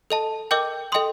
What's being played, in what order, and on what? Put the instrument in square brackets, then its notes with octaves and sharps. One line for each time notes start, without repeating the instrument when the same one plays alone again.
[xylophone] A4 D#5 A5
A#4 D#5 G5 D6 G6
A4 D#5 G5 C6 D#6